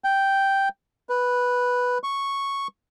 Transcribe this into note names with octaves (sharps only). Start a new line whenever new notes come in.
G5
B4
C#6